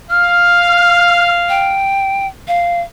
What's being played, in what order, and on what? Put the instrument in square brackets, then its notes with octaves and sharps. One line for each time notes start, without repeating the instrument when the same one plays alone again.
[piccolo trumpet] F5 [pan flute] F6
[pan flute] G5
F5